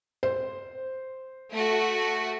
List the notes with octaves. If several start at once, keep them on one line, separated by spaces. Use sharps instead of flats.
C5
A3 F#4